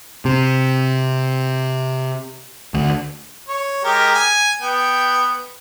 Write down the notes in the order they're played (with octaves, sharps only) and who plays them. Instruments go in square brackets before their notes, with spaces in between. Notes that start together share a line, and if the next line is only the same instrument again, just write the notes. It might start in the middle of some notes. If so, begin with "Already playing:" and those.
[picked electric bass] C3
D2
[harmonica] C#5
G#3 G4 A#4
G#5
B3 G5